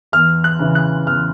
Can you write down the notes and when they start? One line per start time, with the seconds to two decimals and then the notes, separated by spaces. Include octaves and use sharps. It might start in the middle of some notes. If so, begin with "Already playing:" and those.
0.12 E2 F6
0.44 F#6
0.59 C#3 E3
0.75 F#6
1.07 E2 F6